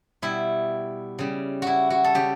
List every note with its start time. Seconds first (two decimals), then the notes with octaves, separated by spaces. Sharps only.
0.22 B2 G3 E4
1.19 C#3 G3
1.62 E4 F#4
1.90 F#4
2.04 A4
2.15 C#3 G3 G4